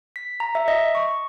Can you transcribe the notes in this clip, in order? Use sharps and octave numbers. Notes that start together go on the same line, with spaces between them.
B6
A#5
E5
D#5
C#6